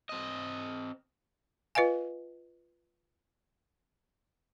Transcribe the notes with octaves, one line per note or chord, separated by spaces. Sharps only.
C4 D#5
F4 B4 D#5 F5 G#5